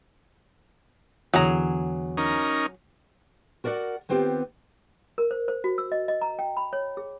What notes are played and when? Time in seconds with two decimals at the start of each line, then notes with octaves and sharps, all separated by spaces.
1.34 E2 D3 F#3 G#4 A#5
2.17 C#4 D#4 A#4
3.64 F#4 A#4 D5 E5 F#5
4.09 D#3 B3 C4 F4 G4
5.18 A#4
5.31 C5
5.48 C5
5.64 F#4
5.78 E6
5.92 D#5
6.08 D#5
6.22 A#5
6.39 G5
6.57 B5
6.73 C#5
6.97 G#4